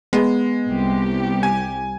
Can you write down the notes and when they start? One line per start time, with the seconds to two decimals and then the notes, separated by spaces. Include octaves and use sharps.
0.13 G#3 B3
0.69 C2 G4
1.43 G#5